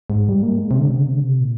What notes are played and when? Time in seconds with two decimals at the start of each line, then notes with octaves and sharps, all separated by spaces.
0.10 G#2
0.29 G3
0.43 A#3
0.57 G#3
0.71 C3
0.79 D3
0.87 C3
0.96 D3
1.03 C3
1.12 D3
1.20 C3
1.40 A#2